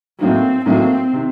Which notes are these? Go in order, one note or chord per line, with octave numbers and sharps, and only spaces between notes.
A2 F#3 A#3 C4 D#4
A2 F#3 A#3 C4 D#4
C3 D#3